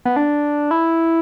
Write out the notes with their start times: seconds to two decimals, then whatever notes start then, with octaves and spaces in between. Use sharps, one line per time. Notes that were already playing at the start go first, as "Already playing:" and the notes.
0.05 B3
0.16 D4
0.71 E4